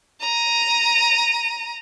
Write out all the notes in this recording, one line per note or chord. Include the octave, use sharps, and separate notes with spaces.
A#5 D#7